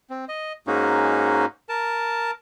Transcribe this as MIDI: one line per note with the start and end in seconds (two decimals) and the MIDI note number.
0.10 0.25 60
0.29 0.52 75
0.67 1.45 44
0.67 1.45 56
0.67 1.45 58
0.67 1.45 61
0.67 1.45 63
0.67 1.45 66
1.69 2.31 70
1.69 2.31 81